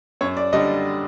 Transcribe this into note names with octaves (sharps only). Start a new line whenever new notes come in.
F#2 C#5
D5
D3 G3 D#5